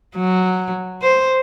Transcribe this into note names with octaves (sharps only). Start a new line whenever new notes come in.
F#3
C5